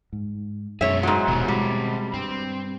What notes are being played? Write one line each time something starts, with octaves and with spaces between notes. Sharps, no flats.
G#2
F#2 B2 G#3 E4 G#4 C#5 E5
G#2 F#3
D#1 B2 B3 E4 G4
B2 G3 G#3 C4 F#4
G2 C4